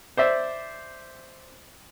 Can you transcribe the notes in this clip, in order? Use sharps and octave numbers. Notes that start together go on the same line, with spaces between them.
C5 D5 E5